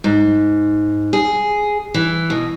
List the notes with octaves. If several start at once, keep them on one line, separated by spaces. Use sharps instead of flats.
G#2
G#4
E3
B2